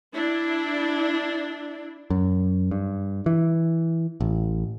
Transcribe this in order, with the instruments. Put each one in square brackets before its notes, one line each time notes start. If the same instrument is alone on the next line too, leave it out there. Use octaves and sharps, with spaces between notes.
[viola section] D4 E4
[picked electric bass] F#2
G2
E3
A1